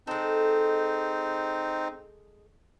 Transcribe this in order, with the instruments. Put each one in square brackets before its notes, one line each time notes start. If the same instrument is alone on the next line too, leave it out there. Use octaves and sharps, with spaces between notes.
[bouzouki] G#3 A4 [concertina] C4 D#4